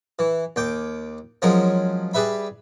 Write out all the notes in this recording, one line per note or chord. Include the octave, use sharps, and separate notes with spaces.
E3
D#2 G5 D6
F3 F#3 G#3 C#4 A#4
G3 G#4 B4 E5 B5